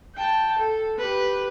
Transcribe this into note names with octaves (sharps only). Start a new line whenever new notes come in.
G5 A5
A4
G4 B4